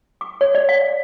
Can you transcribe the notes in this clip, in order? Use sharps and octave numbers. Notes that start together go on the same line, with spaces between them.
D6
C#5
D5
F5